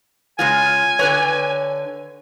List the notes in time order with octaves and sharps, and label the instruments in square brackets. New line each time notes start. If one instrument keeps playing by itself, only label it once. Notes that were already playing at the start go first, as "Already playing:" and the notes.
[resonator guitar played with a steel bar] C#3 G#3 F4 [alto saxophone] G#5
[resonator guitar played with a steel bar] D3 B4 C#5